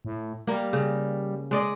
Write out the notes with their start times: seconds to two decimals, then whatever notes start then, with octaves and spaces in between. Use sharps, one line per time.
0.05 A2
0.47 G3 A#3 A#4
0.73 C#3
1.51 G#3 D5 D#5